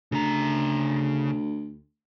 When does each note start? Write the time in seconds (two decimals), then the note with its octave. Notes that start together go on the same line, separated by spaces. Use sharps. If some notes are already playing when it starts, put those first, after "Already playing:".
0.12 D2 C#3 A#5